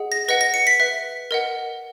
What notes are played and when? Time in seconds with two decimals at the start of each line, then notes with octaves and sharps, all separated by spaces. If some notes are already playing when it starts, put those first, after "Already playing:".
Already playing: G#4 D#5 F#5
0.12 A#6
0.28 B4 D#5 F#5 A#6
0.41 A#6
0.54 C#7
0.67 B6
0.80 B4 E5
1.31 A#4 D#5 F#5